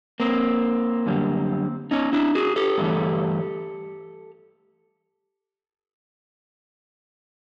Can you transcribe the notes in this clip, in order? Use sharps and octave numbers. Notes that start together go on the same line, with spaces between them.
A#3 C4
F#2 D3 G3
C#4 D#4
D4 E4
F#4 G#4
G4 A4
G2 E3 A3